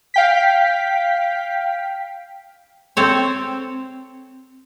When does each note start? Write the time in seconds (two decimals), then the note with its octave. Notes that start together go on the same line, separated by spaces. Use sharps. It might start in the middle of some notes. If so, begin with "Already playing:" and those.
0.14 F5 G5 B6
2.97 C4 A4 C#5